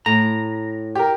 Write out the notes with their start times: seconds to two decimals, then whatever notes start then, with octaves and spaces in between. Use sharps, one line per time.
0.06 A2 A#5
0.95 G4 A#4